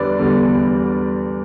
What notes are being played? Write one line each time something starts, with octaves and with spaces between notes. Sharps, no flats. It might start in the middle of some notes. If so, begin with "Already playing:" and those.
Already playing: E2 D3 G3 B4 D5
E2 D3 G3